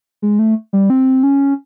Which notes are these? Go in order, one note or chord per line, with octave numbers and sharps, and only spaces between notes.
G#3
A3
G3
C4
C#4